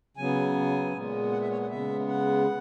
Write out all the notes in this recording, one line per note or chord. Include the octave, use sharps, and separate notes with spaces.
C#3 F#3 B3 G#5
A#2 G#3 B3
F#5
E5
C#5
F#5
C#3 G#3 B3 E5
F#5